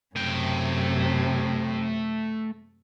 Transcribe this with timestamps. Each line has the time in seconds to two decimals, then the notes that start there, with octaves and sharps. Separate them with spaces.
0.16 F#2 C3 A3 G5